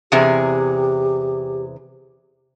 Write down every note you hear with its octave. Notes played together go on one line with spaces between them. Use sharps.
E2 C3 G4 G#4